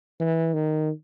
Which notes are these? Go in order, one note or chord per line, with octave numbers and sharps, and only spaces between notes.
E3
D#3